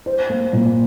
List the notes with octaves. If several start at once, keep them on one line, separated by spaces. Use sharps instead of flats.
C5
A#3
A#2